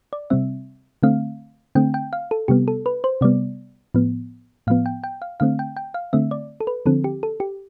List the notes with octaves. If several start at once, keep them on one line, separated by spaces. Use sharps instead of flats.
D5
C3 G3 C4 E5
D3 A3 C4 F5
D3 A3 C4 G5
G5
F5
A4
C3 G3 B3 G4
A4
B4
C5
C3 G3 B3 D5
A2 F3 B3
A2 F3 B3 F5
G5
G5
F5
D3 A3 C4 F5
G5
G5
F5
D3 A3 C4 E5
D5
A4
B4
D3 F3 C4 A4
G4
A4
G4